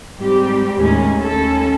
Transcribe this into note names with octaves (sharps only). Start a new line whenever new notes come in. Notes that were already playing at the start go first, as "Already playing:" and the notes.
G#2 G3 C4 G4
D#2 A2 G#3 C#4
D#2 C#4 A4